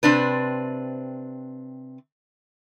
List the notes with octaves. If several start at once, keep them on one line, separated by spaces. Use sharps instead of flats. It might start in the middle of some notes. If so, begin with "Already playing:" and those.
C3 C4 D4 B4